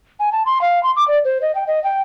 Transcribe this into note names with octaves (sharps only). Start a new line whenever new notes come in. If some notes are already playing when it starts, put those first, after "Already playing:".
G#5
A5
C6
F5
C6
D6
D5
C5
D#5
G5
D#5
G5